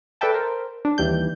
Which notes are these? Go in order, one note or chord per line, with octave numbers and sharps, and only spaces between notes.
A4 B4 D5 E5 G5 A5
A#4 C5
D4
D#2 E3 G3 G6